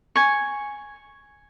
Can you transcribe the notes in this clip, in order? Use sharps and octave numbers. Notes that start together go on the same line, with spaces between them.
G#5 C#6